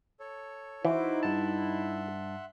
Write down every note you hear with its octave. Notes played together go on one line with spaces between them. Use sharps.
A4 C#5
E3 D#4 E4 F#4 C5 D6
G2 E5 F#5 A5 C6